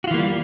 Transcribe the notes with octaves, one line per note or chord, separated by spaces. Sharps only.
E3 G3 A#3 F4 F#4